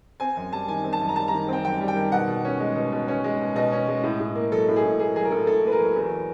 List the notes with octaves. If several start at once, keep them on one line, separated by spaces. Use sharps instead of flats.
C4 G#5
F#2
G3 A5
D#3 G#5
C4
A5
F#2
A#5
G3 A5
A#5
D#3
C4 G5
F#2 G5
G3
G5
D#3
B2 F#5
B2
C#4
G#3
B2
B2
C#4
G#3
B2
B2 D#5
C#4
G#3
A2
A2
A#3
F#3 A4
A2
G#4
A2
A#3 G#4
F#3 G#4
A#4
A2 A4
A2 A4
A#3 B4
A#4
F#3
E2